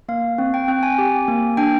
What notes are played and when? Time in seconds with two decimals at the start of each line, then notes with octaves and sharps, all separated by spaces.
0.09 A#3 F5
0.38 C4
0.54 G5
0.68 C4 G5
0.83 G#5
0.98 G4
1.28 A#3
1.57 D4 G5